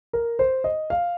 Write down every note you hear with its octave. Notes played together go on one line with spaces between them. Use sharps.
A#4
C5
D#5
F5